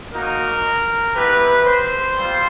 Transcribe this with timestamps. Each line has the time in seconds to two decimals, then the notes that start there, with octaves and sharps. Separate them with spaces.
0.12 A#3 D#4 F#4 A#4
1.14 B3 E4 G4 B4
1.64 C5
2.14 G3 C4 F4